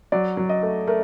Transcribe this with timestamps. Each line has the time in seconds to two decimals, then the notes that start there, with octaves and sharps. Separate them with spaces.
0.12 F#3 D5
0.37 F#3
0.49 D#5
0.63 A3
0.87 A3 A#4